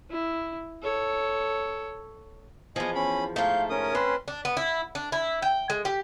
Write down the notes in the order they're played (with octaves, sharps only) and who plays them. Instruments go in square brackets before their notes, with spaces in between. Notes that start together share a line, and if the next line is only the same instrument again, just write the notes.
[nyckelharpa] E4
A4 C#5
[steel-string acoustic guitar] E2 F3 [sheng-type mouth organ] D#5 G#5
[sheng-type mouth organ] C#4 B5
[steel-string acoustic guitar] G#2 F3 A3 [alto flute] F5 [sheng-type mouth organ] G6
[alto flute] C#4 [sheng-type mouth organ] A#4 D#6
[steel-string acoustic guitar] C4 [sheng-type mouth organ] B4 C6
[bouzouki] D4
B3
E4
D4
E4
G5
G#3
G4